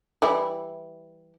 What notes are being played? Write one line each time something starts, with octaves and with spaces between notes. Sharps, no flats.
E3 G3 E4